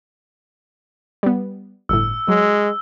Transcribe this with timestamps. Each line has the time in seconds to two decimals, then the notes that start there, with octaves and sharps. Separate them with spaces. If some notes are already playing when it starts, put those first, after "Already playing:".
1.23 G3 B3
1.89 G1 A2 E6
2.28 F#3 G#3